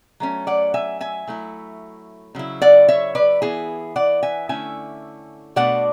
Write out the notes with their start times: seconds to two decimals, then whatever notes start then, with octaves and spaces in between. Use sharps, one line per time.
0.20 F#3 A3 C#4
0.47 D5 F#5
0.74 E5 G#5
1.01 E5 G#5
1.27 F#3 A3 E4
2.35 C#3 F#3 E4
2.62 D5 F#5
2.88 C#5 E5
3.15 B4 D5
3.42 E3 B3 E4 G#4
3.96 D5 F#5
4.23 E5 G#5
4.49 D3 A3 C#4 E4 E5 G#5
5.56 B2 A3 D4 D5 F#5